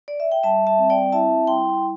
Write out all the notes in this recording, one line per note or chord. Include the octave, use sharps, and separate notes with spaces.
D5
E5
G5
G3 E5 A5
E5 A5
C4
D5 G5
E4 E5 A5
G3 G5 C6